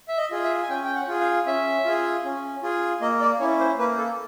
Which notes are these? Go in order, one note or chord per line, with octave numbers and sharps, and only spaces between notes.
E5
D#5
F4 G#4
E5
G#5
C#4 G5
G5
F#5
F4 G#4
F5
C#4 E5
F4 G#4
C#4
F4 G#4
A#3 D#5
D5
C#4 E4 C#5
C5
A#3 B4
A4